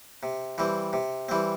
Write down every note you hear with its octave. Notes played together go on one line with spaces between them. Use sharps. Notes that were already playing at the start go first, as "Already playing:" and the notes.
C3
E3 G3 C4
C3
E3 G3 C4